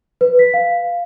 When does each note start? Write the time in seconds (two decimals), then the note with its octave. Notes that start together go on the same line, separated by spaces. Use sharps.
0.21 B4
0.39 B6
0.54 F5